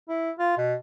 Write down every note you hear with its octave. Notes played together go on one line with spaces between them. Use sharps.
E4
F4
B2